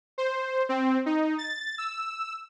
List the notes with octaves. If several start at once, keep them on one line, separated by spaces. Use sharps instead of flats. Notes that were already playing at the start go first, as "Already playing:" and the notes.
C5
C4
D#4
A6
E6